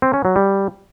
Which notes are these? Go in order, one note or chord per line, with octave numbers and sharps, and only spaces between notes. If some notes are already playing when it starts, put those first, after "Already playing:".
C4
C#4
F#3
G3